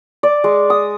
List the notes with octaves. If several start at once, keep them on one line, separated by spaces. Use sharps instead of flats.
D5
G#3
D#6